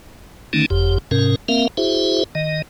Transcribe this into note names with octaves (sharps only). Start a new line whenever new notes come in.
D3 D#3 A3 C#4 D#4
F#1 F2 G4
G#2 C3 C#4 A#4
A#3 C4 A#4 E5 F5
E4 F#4 G#4 C5 E5
D#3 D#5